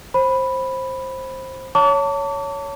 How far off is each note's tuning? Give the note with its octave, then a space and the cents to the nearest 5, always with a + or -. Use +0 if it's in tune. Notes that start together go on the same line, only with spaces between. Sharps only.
C5 +15 B5 +0
C#5 +10 A5 +30 D6 -40